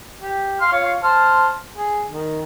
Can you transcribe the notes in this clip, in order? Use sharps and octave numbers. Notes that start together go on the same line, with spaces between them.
G4
F5 C6 F6
F4 C#5 F5
C5 A5 F6
G#4
D#3